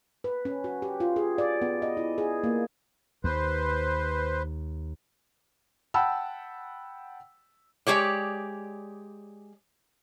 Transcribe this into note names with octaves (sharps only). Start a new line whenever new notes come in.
B4
C#4
F#4
G4
F4
G#4
D5
B3
D#5
E4
G#4
A#3
D#2 B4 C5
F#5 G5 A5 B5 E6
G#3 G4 C#5 D5